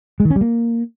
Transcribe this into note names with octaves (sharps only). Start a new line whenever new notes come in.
G#3
D#3
C#4
G3
A#3